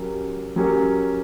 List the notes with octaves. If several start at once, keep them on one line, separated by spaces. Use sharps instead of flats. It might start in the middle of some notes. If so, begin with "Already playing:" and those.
Already playing: F#3 C#4 G4 A#4
F#3 C#4 G4 A#4